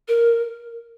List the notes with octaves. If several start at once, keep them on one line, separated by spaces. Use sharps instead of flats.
A#4